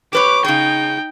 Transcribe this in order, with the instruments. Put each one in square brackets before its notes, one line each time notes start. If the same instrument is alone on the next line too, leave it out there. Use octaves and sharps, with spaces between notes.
[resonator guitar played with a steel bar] G4 B4 C#5 [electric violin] D6
[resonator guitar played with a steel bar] C#3 G#4 [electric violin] D#4 G5